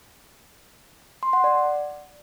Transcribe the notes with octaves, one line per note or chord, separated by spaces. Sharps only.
C6
F#5
D5